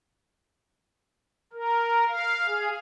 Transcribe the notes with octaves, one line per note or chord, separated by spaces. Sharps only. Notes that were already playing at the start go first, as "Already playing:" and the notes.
A#4
F5
G#4